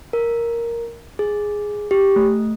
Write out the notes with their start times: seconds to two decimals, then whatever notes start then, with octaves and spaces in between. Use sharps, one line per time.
0.13 A#4
1.19 G#4
1.91 G4
2.16 A3